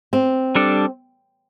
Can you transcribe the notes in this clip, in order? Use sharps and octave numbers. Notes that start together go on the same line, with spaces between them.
C4
G3 D4 A4 D5